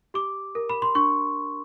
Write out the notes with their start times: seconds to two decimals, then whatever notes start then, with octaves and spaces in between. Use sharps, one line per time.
0.14 G4 D6
0.55 A#4
0.69 B5
0.82 C6
0.95 D4 C#6